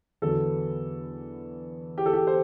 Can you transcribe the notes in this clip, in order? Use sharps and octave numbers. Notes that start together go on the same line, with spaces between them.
E2 D3 F#3 B3 A4
G4
A4
G4
C5